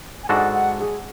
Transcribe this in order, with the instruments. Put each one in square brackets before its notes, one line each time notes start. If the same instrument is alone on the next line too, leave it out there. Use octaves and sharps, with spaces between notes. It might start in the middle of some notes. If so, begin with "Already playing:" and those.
[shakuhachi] G#5
[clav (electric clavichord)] G#2 G#3 D4 F#4 A4 [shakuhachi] F#5
[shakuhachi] F#5
G#4